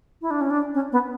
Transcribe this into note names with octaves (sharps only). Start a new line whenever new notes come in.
E4
D4
C#4
D4
C#4
B3